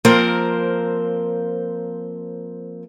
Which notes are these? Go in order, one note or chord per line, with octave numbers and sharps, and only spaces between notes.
F3 A#3 C4 A#4 C5